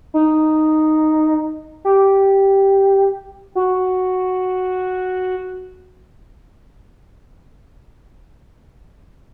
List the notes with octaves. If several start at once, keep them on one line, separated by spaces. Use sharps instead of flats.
D#4
G4
F#4